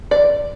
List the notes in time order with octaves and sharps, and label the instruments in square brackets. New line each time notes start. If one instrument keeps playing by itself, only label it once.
[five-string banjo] D5